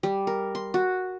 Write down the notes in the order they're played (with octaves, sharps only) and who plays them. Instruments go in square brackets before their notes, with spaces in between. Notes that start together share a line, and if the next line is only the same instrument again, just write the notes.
[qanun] G3
A#4
C6
F#4